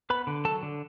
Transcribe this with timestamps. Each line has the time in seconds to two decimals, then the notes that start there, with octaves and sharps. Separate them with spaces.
0.10 B3 B4 B5
0.27 D3
0.45 F#3 A4 A5
0.63 D3